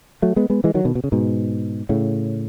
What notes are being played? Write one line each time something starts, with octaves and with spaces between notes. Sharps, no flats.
F#3 A3
G#3 B3
G#3 B3
E3 G#3
D#3 F#3
B2 D#3
B2
C#3
G#2 B2
A2 C#3